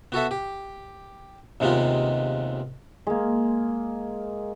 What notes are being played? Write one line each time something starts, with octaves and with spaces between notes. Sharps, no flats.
B3 F#4 A4 E5
G4
D#2 C3 G#3 B3 D#4 F4
G#3 A#3